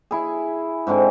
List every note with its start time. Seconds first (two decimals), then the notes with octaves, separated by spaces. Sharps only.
0.11 E4 G#4
0.87 G#2 D3 G#3 C4